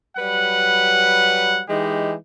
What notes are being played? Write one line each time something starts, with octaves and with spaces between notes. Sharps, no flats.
F#3 G3 B4 F#5
E3 G#3 D#4 G4